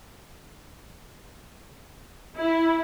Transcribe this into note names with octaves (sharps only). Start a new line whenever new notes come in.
E4